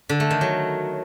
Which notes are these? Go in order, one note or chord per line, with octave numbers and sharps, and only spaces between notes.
D3
A3
D#3
F#3